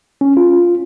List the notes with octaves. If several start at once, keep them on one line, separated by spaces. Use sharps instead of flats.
C#4
F4